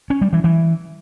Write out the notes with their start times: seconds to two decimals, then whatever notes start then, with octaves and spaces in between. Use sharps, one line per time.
0.10 C#4
0.21 G3
0.33 E3
0.44 E3